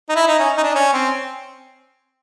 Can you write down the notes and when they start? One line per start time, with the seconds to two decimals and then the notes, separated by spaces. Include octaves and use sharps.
0.09 D#4
0.15 E4
0.27 D#4
0.40 C#4
0.57 D#4
0.63 D4
0.75 C#4
0.93 C4